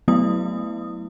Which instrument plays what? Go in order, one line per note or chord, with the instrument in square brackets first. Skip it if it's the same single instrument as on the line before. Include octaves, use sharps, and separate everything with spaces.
[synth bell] F#3 A3 B3 E4 D#6